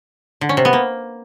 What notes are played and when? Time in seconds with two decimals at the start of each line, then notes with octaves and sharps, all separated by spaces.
0.41 D3
0.49 C#4
0.57 C3
0.65 B3
0.73 A#3